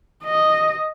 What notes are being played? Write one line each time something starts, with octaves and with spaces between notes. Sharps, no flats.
D#5